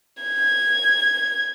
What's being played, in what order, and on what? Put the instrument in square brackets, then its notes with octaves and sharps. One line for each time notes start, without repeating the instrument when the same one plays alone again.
[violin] G#6